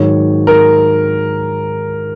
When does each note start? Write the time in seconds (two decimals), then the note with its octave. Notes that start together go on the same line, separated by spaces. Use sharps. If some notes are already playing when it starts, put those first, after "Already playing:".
Already playing: G#2 D#3 F#3 C#5
0.47 A#4